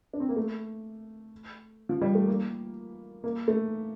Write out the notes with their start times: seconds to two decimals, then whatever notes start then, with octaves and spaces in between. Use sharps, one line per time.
0.13 D4
0.20 C4
0.29 A#3
0.36 A3
1.89 F3
2.01 G3
2.15 A3
2.27 A#3
3.24 A#3
3.48 A3